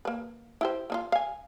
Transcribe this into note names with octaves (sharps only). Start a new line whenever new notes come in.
A#3 B4
E4 G4 C5
A#3 D#4 F4
F5 G#5